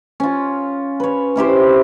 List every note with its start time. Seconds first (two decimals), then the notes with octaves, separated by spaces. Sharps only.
0.20 C#4 F4
1.00 B4 C#5
1.36 C#4 E4 G4 C5